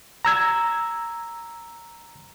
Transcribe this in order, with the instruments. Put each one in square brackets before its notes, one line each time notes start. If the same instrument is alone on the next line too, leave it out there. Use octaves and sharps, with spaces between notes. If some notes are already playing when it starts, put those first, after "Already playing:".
[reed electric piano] A#5 E6 G#6